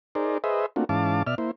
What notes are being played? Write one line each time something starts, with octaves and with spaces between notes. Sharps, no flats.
D#4 G#4 A#4 C5 D5
G#4 B4 C5 D#5 E5
A3 A#3 C4 D4 F4 F#4
G#2 E3 C#4 F5 A5 D6
B2 D5 E5 F6
A#3 E4 C5